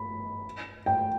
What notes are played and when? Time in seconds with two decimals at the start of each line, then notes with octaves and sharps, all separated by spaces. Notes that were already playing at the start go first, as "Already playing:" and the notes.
Already playing: B5
0.86 G5